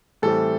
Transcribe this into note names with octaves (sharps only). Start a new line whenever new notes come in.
A2 E3 G3 C4 A4